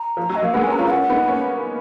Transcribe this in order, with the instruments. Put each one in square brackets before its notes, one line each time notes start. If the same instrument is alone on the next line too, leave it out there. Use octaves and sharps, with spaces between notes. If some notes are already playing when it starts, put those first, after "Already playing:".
Already playing: [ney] A#5
[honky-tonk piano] F3
F#3
[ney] D#5
[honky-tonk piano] F#3 A#3 [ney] F5
[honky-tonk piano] G#3 B3 [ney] F#5
[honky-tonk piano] A#3 C#4 [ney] G#5
[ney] A#5
[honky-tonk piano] C#4 F4
[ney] F5
[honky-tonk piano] C#4 F4 [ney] F#5
[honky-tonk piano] B3 D#4
A#3 C#4